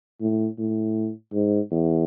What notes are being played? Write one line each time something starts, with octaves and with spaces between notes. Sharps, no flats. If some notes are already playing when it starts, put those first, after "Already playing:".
A2
A2
G#2
E2